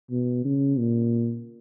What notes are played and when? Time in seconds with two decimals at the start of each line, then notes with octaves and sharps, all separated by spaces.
0.10 B2
0.44 C#3
0.78 A#2